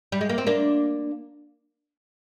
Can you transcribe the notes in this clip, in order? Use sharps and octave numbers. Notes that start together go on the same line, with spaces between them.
G3
G#3
A#3
C4
A#3 D4